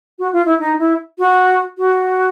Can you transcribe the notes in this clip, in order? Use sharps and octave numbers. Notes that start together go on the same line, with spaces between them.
F#4
F4
E4
D#4
E4
F#4
F#4